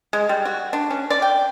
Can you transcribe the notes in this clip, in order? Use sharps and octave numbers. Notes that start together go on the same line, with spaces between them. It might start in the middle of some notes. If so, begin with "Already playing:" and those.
G#3
G3
F#4
D4
C#4
D5
G5